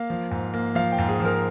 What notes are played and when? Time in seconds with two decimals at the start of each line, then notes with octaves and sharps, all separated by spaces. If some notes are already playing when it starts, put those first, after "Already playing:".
Already playing: A#3 F5
0.10 F3
0.31 G#2
0.54 A#3
0.75 F3 F5
0.92 G5
0.98 G#2
1.09 G#4
1.20 F3
1.25 A#4